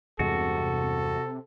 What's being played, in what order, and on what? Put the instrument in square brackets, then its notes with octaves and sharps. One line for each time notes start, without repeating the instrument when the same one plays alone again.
[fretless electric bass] E2 G2 G#3 [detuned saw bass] C3 [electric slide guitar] F#4 [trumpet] A4